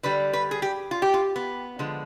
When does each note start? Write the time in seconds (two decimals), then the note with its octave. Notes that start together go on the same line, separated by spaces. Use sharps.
0.03 D3 G3 B4
0.33 B4
0.51 G#4
0.62 G4
0.91 F4
1.02 G4
1.14 F4
1.36 B3
1.79 D3 F3 G#3